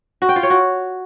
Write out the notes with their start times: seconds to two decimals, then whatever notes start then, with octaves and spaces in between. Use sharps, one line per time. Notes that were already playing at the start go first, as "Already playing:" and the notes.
0.22 F#4
0.29 G5
0.36 F4
0.43 C#5
0.50 F#4